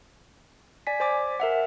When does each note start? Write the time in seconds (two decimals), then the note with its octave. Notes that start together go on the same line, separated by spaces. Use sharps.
0.87 D5 G#5 B6
1.00 C5 D5 G#5 D6
1.40 A#4 E5 F#5